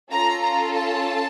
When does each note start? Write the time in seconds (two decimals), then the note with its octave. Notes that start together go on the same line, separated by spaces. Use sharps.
0.11 C#4 F4 A4 A#5
0.42 A#5
0.74 A5